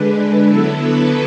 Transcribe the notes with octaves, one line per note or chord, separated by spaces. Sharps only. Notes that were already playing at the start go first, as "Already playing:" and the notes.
Already playing: D3 G#3 D4 B4
D3 F#3 B3 E4 A4
B4